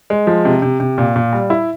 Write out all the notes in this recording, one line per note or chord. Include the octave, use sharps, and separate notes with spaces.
G#3
F3
C3
C3
C3
A#2
A#2
G3
E4